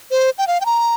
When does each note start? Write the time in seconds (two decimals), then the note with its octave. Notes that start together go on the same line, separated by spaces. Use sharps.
0.11 C5
0.38 G5
0.47 F5
0.61 G5
0.66 A#5